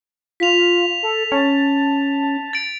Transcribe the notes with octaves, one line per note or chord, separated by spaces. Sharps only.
F4 B6 F7
A4
C#4 A5
A6 D7